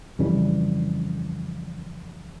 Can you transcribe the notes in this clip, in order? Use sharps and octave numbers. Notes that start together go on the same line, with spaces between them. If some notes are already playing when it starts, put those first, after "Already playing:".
F2 C#3 E3 G3